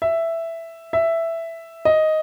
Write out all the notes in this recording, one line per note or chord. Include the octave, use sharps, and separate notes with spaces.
E5
E5
D#5